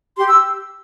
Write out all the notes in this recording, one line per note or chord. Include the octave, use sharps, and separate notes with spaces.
G4 C6
E6